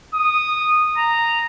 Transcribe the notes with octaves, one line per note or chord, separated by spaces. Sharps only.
D#6
A#5